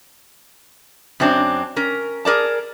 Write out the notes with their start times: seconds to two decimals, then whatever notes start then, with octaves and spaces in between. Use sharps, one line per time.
1.20 F#2 F#3 C4 D4
1.76 C#4 A#4
2.25 G#4 A#4 D5 A5